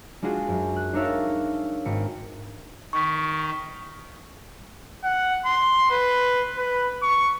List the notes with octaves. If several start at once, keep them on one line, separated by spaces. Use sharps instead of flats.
G#3 D4 F4 F#4 G#4
F#2
F#6
D4 D#4 A#4 C#5 E5 F5
G#1 C#7
D#3 C#6 B6
F#5
C6
B4
B4
C#6